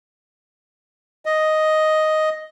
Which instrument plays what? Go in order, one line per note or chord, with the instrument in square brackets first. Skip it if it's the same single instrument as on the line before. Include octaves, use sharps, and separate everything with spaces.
[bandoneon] D#5